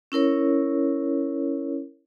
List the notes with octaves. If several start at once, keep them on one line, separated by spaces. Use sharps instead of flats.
C#4 E4 A#4 C#5